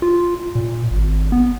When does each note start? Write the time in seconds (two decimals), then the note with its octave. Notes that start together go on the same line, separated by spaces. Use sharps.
0.02 F4
0.55 A#2
0.91 G#1
1.32 B3